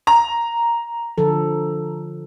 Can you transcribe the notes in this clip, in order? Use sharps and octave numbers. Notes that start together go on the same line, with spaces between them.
A#5
D3 F3 A4